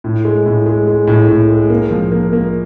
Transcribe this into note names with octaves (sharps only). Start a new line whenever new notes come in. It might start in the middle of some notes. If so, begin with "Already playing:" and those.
A2
G#3
A2
G#3
G#3
A2
A2
G#3
A#3
F3
A#3
A#3